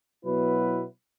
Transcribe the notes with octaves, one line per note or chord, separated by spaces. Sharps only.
B2 F#3 B3 E4 B4